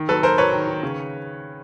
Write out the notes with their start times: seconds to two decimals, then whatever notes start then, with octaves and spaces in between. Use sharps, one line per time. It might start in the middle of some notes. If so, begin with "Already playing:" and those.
Already playing: D#3
0.09 F#3 A4 B4
0.23 F#3 A#4 C5
0.38 F#3 B4 C#5
0.53 D#3
0.67 D#3
0.83 C#3